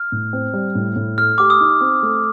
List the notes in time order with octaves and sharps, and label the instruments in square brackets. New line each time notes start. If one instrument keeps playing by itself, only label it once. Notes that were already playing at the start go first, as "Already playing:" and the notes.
Already playing: [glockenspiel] F6
[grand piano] A2
C4
G3
A2
A2
[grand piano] A3 [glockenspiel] F6
[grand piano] G4 [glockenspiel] D6
[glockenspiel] D#6
[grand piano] D#4
C4
A3